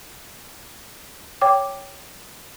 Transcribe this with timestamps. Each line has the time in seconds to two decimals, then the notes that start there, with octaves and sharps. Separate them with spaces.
1.41 C#5 G5 D6